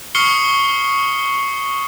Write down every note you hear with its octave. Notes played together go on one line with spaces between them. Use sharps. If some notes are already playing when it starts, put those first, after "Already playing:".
C#6 D#6 F6 C7 C#7 G7